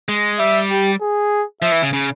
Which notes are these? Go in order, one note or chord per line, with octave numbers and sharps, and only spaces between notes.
G#3
G3 E5
G4
G#4
F3 E5
E3
C#3
C#3